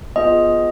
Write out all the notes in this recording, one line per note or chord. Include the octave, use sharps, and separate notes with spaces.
B3 F4 G#4 D#5